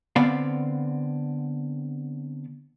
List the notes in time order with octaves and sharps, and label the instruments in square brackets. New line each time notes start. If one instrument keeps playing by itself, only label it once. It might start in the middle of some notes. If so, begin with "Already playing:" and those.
[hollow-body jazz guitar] D3 B3 C4 D5 F5